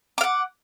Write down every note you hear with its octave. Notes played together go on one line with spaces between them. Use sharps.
F5 F#5 D6